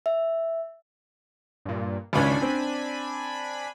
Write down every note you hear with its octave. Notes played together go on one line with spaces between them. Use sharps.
E5
G2 A#2
G#1 C#2 C#4 D4 G#5 B5
C4